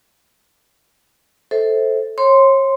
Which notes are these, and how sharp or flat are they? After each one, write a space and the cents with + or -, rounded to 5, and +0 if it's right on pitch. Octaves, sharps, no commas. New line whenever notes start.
A4 +0 C5 +0 E5 -30
C#5 -35 C6 -5